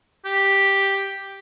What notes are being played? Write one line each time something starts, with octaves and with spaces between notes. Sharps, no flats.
G4